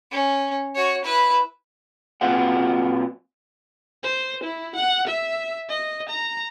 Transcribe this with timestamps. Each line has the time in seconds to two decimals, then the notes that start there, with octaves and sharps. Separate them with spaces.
0.11 C#4
0.75 F#4 C#5
1.04 E4 B4
2.21 A#2 F#3 C4 F4 B4 F#5
4.03 C5
4.44 E4
4.76 F#5
5.07 E5
5.69 D#5
6.09 A#5